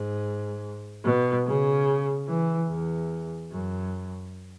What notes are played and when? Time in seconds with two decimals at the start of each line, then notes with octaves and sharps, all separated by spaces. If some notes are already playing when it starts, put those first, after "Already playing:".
Already playing: G#2
1.04 B2
1.46 C#3
2.28 E3
2.69 E2
3.52 F#2